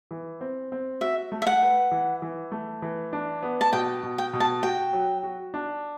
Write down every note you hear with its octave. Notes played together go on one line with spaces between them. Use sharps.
E3
C4
C4
F#4 E5
A3
E5
F#5
B4
E3
E3
A3
E3
D4
B3
A5
B2 G5
B2
G5
B2
A5
F#4 G5
F#3
F#4
D4